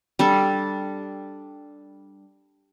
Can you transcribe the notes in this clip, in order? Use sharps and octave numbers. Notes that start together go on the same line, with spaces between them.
G3 D4 A4